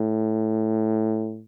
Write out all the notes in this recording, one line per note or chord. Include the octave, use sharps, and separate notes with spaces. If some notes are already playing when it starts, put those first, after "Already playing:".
Already playing: A2